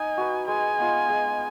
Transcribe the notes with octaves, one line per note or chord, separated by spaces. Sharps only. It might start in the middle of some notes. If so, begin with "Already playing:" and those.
Already playing: D#4 G#5
F#4 B4
G#3 G#5
B3 F4
G#3